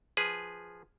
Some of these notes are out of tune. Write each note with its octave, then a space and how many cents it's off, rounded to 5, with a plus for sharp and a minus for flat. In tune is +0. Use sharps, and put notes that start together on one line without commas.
F3 +0 G#4 +0 B4 +0